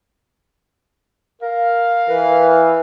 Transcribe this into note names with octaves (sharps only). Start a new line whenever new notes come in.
A#4 F5
E3 B4